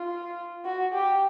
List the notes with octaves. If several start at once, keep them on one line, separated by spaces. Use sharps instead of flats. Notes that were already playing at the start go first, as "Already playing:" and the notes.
Already playing: F4
F#4
G4